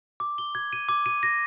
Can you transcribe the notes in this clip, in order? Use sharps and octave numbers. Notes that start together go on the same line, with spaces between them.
D6
G7
G#6
D#7
D6
D#7
A#6